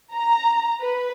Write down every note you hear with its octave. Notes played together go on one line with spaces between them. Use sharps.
A#5
B4